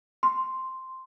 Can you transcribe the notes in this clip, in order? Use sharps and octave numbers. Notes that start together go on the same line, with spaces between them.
C6